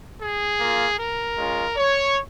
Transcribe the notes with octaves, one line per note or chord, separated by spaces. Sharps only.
G#4
A#3 F4
A#4
G#3 C#4 F4
C#5